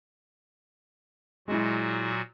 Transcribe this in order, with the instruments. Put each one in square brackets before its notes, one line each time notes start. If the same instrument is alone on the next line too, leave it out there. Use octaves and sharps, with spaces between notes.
[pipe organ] A#2 F#3 F#4 [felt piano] G#3 E4